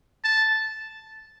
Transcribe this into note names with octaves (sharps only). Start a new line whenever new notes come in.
A5